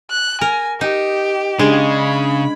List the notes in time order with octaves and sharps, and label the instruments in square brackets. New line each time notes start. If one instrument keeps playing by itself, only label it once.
[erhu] F#6
[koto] A#4 [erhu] G#5
[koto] D#4 [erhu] G4
[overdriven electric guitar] C#3 [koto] G#3 [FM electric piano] D4 G#6
[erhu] B5